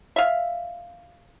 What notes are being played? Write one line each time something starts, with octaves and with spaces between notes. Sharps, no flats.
E5 F5